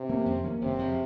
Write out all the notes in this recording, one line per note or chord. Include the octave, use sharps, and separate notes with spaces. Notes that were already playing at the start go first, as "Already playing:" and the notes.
Already playing: C3
D#3 A#3 C#4
F2
D#3 A#3 C#4
F#1 C3
F2 C#3 F3